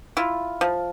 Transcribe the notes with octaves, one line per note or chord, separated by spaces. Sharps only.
E4 F4
F3